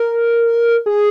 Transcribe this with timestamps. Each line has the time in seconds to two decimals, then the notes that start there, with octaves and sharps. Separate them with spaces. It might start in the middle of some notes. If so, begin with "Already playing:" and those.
Already playing: A#4
0.86 G#4